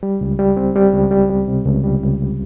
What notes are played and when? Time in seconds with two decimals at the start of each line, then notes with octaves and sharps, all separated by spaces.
0.03 G3
0.21 C#2
0.39 G3
0.57 C4
0.76 G3
0.94 C#2
1.11 G3
1.30 G3
1.48 C3
1.66 C#2
1.84 G3
2.02 C#2